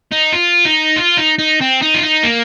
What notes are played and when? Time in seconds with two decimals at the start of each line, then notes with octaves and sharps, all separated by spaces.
0.12 D#4
0.33 F4
0.65 D#4
0.97 F4
1.18 D#4
1.39 D#4
1.61 C4
1.82 D#4
1.94 F4
2.03 D#4
2.23 A#3